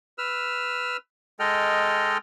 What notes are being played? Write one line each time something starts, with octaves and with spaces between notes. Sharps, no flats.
B4 E6 F6
G#3 A4 D#5 G5 F6